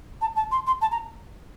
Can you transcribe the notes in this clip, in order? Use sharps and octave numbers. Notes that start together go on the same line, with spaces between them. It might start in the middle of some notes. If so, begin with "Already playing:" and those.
A5
A5
C6
C6
A5
A#5